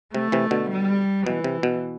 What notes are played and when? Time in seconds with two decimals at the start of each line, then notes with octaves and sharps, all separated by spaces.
0.14 C3 A3
0.32 C3 E3
0.51 B2 D3
0.70 G3
1.26 B2 E3
1.44 C3
1.63 B2